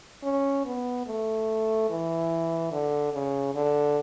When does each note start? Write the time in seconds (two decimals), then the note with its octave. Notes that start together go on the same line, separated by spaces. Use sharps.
0.23 C#4
0.65 B3
1.07 A3
1.89 E3
2.72 D3
3.13 C#3
3.55 D3